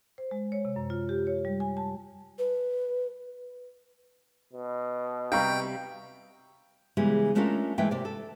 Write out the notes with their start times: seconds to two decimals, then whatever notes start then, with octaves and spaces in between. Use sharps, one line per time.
0.18 C5
0.31 G#3
0.52 C#5
0.65 C3
0.76 F#2
0.90 F4
1.09 G4
1.27 C#5
1.45 G3
1.60 G#5
1.77 A5
2.38 B4
4.53 B2
5.32 C3 G3 F5 G5 A#5 C#6
6.97 C#3 E3 G3 G#3 B3
7.35 G#3 A3 C#4 D4 F4 A#4
7.78 E3 G#3 A3 E4 G5
7.91 C3 D5
8.05 A4